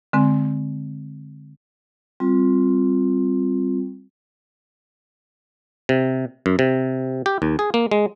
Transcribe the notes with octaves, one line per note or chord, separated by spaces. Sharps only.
D3 G#3 C4
G3 C4 F4
C3
F#2
C3
G4
D#2
G#4
A#3
G#3